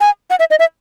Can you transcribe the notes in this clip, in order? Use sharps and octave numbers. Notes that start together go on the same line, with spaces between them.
G#5
F#5
E5
D#5
E5